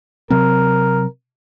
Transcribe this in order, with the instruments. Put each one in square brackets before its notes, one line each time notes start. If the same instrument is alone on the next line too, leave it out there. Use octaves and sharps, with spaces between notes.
[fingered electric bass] C3 F#3 C4 [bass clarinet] A#4